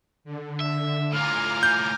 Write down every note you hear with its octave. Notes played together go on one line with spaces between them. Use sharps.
D3
E5
A2 F4 G#5 A#5 D6 F6
G6